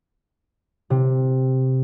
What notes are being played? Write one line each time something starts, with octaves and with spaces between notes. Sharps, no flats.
C3